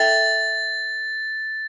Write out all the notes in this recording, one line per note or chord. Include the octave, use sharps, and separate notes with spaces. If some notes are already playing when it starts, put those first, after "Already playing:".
Already playing: A4 E5 G5 A6